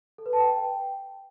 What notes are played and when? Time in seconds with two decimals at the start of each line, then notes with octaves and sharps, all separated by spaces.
0.18 A4
0.26 B4
0.33 A5
0.40 G5